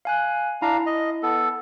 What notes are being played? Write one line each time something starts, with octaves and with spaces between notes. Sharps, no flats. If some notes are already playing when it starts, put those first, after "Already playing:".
F5 G#5 F#6
D4 E4 F5 A#5
D#5
B3 A4